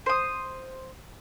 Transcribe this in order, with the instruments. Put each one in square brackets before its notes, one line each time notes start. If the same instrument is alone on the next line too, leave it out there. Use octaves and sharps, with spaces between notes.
[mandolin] C5 D#6